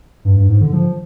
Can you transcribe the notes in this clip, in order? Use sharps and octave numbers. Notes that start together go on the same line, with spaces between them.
G2
G2
G#2
D3
F3